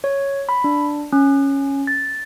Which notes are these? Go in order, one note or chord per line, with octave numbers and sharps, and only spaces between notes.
C#5
B5
D4
C#4
A6